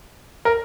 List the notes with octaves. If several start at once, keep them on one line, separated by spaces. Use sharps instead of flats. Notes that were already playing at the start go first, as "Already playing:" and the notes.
A#4